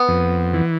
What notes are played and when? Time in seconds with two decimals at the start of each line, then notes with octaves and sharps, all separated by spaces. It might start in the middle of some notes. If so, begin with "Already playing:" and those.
Already playing: B3
0.08 F2
0.54 E3